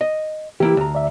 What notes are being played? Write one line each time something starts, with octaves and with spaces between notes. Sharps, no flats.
D#5
E3 A#3 E4 G4
D2 A#5
D5 E5